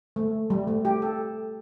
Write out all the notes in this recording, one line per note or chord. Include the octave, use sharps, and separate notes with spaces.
A3
G3
A3
G4
A4